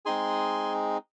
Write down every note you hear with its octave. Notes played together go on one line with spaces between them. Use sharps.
G#3 C4 D#4 G#4 G#5 C6